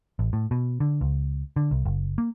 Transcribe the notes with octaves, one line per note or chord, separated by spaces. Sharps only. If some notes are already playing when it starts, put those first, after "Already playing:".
A1
A2
B2
D3
C#2
D3
C2
F#1
A#3